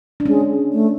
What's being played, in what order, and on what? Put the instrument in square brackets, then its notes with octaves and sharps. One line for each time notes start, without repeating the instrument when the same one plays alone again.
[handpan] D4
[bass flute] G#3 [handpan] C#4
[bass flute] A3